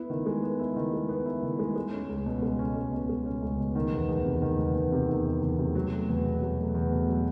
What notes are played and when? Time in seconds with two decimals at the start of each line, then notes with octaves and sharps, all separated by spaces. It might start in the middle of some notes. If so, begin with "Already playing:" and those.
Already playing: B3 E4
0.10 D#3
0.26 G#3
0.43 B3
0.60 E4
0.76 D#3
0.93 G#3
1.09 B3
1.26 E4
1.43 D#3
1.59 G#3
1.76 G#3
1.93 C#4
2.09 C#2
2.26 B2
2.42 G#3
2.59 C#4
2.76 C#2
2.92 B2
3.09 G#3
3.26 C#4
3.42 C#2
3.59 B2
3.75 D#3
3.92 E2
4.09 E2
4.25 C3
4.42 D#3
4.59 E2
4.75 E2
4.92 C3
5.09 D#3
5.25 E2
5.42 E2
5.59 C3
5.75 F#3
5.92 A3
6.09 E2
6.25 B2
6.42 F#3
6.58 A3
6.75 E2
6.91 B2
7.08 F#3